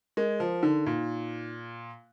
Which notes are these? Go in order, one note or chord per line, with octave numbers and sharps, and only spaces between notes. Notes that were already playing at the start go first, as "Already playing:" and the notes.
G#3 A#4
F3
D3 D#4
A#2